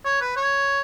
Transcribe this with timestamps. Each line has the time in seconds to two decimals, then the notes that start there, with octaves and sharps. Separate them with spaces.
0.05 C#5
0.21 B4
0.36 C#5